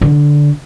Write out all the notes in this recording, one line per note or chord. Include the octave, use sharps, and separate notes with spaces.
D3